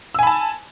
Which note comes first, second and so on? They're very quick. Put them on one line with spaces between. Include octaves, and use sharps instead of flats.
E6 G#5 B5 A5